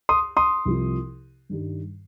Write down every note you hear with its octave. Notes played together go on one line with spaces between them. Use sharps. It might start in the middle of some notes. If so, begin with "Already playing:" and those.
C6 D#6
C6 D#6
C2 C3 F3
G2 D#3 G3